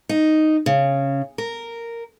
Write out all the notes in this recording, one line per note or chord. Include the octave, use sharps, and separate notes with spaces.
D#4
C#3
A#4